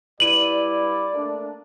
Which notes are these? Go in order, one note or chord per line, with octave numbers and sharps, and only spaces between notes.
G2 E4 D5 D#7 F#7
A3 A#3 D4